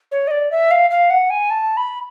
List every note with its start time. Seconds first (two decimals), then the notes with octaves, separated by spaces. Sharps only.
0.11 C#5
0.27 D#5
0.31 D5
0.51 E5
0.71 F5
0.90 F5
1.10 F#5
1.30 G#5
1.50 A5
1.77 B5